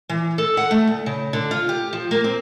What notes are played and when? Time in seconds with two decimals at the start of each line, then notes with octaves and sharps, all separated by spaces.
0.09 E3
0.38 A4
0.57 F#5
0.71 A3
0.87 D2
1.06 C#3
1.33 D3
1.51 F4
1.69 G4
1.93 F3
2.11 A#3
2.24 C4